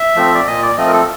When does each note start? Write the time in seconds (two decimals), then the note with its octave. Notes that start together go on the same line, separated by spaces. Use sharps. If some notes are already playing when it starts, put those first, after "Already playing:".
Already playing: E5
0.16 F3 A3 C4
0.35 D5
0.47 A#2 D#5
0.62 D5
0.77 F3 A3 C4 D#5
0.87 A#4
0.93 A4